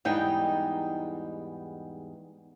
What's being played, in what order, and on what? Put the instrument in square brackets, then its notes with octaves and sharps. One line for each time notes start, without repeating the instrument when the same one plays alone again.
[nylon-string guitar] E2 G#2 G3 D#4 G5